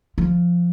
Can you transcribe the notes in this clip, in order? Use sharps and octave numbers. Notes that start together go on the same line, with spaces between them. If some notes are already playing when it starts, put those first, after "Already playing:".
F3